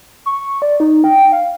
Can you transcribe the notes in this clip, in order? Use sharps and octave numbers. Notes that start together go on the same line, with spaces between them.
C#6
D5
D#4
G5
F5